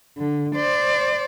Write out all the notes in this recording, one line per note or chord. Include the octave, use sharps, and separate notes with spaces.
D3
C5 D5